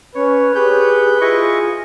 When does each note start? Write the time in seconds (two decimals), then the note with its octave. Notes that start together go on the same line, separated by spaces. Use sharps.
0.15 C#4 B4 C#5
0.55 G4 G#4 B4 G6
1.21 E4 F4 G#4 D#5 C#6